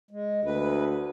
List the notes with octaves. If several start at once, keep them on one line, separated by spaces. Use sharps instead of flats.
G#3
D2 B4